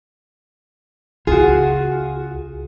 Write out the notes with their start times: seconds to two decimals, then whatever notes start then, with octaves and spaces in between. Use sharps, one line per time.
1.27 C#2 F4 F#4 G#4